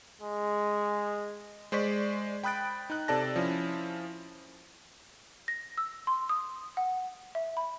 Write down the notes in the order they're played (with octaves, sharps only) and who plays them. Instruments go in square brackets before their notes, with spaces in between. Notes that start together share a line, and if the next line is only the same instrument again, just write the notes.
[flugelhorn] G#3
[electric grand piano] G#3 C5 D5 C#6 B6
G5 B5 D#6 F#6 A6 D7
D#4 F#6
C3 A4 D5 A5 A#6
F3 C#4 E4
[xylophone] A#6
E6
C6
D#6
F#5
E5
B5